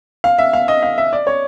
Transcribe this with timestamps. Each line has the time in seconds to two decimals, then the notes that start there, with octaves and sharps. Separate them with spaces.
0.24 F5
0.38 E5
0.53 F5
0.68 D#5
0.83 F5
0.98 E5
1.13 D5
1.27 C#5